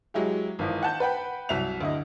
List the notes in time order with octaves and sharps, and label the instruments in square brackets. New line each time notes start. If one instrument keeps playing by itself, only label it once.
[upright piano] F#3 G#3 E4 G4
G#1 E3 F3
F#5 A5 G6
B4 F#5 G5 B5
C2 F#3 E5 F7
D2 E4 D#5